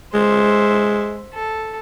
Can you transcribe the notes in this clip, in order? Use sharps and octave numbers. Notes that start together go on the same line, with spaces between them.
G#3 C5 E5
A4